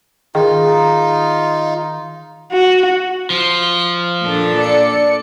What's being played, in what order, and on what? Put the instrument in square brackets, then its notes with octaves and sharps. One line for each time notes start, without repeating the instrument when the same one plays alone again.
[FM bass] D#3 [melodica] D#4 F4 [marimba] G#4
[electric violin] F#4
[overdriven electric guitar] F3
[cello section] A#2 D4 A4
[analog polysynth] D5 C#7